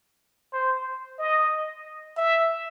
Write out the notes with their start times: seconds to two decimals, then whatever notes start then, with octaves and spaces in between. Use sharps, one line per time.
0.53 C5
1.19 D#5
2.17 E5